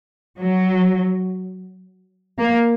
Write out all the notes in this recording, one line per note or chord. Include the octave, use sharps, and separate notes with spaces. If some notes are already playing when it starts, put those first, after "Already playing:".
F#3
A#3